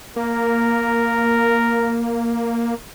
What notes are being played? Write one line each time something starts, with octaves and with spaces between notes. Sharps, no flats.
A#3 A#4